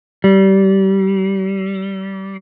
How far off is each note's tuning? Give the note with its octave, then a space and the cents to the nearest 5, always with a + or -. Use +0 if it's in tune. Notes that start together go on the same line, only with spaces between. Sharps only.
G3 -25